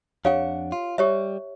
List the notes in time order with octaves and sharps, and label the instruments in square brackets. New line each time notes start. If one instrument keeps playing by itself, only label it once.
[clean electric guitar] F2 D4 F#5 [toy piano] G4 C#5 F5
[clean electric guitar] F4
[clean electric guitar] G3 [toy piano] G4 C#5 E5